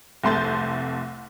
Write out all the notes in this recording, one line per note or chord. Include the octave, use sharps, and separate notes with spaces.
F1 C2 A3 C6 G6 A6